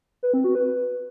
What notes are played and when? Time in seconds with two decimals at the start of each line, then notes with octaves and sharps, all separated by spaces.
0.23 B4
0.34 C4
0.44 F#4
0.55 B4